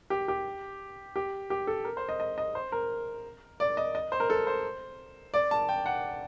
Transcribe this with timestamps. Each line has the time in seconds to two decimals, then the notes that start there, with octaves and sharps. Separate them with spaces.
0.10 G4
0.28 G4
1.16 G4
1.50 G4
1.67 A4
1.85 A#4
1.97 C5
2.09 D#5
2.20 D#5
2.38 D#5
2.55 C5
2.72 A#4
3.60 D5
3.77 D#5
3.95 D#5
4.12 C5
4.20 A#4
4.30 A4
4.47 C5
5.34 D5
5.51 A5
5.69 G5
5.86 F#5